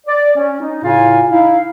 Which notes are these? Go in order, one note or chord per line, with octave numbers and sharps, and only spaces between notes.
D5
C#4
D#4
A2 C#3 E4 F4 F5 G#5
D#4 E4 F5